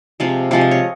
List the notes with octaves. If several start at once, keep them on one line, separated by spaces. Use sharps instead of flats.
C3 F3 G#3 F5
C3 F3 G#3 F5
D#5
C#5